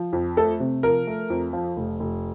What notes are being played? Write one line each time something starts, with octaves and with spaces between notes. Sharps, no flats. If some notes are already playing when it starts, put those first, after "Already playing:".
Already playing: F3
F2
A3 A4
C3
F3 A#4
A3
F2
F3
F1
F1